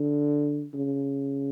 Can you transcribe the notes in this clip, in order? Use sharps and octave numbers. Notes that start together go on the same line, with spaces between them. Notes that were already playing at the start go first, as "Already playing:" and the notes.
Already playing: D3
C#3